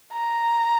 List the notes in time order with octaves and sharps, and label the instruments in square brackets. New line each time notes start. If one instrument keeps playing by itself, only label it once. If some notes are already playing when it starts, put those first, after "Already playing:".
[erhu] A#5